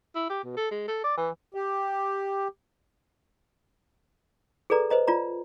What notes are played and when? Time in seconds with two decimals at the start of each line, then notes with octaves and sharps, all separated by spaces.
0.15 E4
0.30 G4
0.44 B2
0.57 A4
0.71 G#3
0.88 A4
1.04 D5
1.17 E3
1.54 G4
4.70 G#4 A4 B4 D5 A#5
4.90 B4 C5 D#5 A#5
5.08 F4 D5 A#5